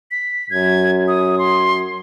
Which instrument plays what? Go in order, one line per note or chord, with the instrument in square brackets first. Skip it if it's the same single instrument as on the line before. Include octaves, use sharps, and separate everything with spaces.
[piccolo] B6
[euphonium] F#2 [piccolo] G#6
[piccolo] D#6
C6